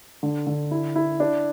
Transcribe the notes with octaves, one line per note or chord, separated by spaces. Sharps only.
D3
D3
E4
E4
D4